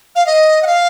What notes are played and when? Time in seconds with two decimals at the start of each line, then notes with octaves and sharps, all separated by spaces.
0.15 F5
0.26 D#5
0.62 F#5
0.67 F5